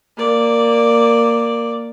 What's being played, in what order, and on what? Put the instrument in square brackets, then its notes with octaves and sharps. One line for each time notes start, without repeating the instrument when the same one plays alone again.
[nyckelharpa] A#3 D5